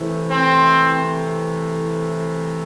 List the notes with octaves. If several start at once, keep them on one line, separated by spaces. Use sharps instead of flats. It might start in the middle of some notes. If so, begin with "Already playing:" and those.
Already playing: C3 E3 A3
C4